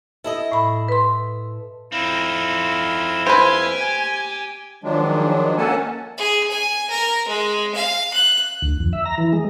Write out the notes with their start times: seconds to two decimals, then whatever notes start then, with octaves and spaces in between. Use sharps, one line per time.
0.24 E4 A4 D#5
0.52 A2 B5
0.88 B4 C6
1.92 F2 C4 D#4 E4 F5
3.27 G4 B4 C5 G#5
4.84 D#3 F3 F#3 G#3 D4
5.58 A#3 C#4 A4 F#5 G#5 A5
6.18 G#4
6.51 G#5
6.90 A#4
7.28 G#3
7.75 F5
8.14 F#6
8.62 D2
8.80 F2
8.93 E5
9.06 A#5
9.18 E3
9.33 G#3